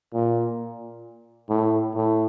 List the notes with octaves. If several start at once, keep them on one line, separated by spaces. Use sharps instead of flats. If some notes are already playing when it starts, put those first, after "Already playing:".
A#2
A2
A2